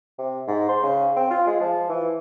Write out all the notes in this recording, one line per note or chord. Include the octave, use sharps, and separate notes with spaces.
C3
G#2
C5
C#3
C4
F4
G#3
F3
E3